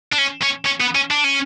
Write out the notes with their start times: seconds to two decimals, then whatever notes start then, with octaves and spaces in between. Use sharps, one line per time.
0.12 D4
0.18 C#4
0.42 C#4
0.65 C#4
0.80 B3
0.95 C#4
1.11 D4
1.24 C#4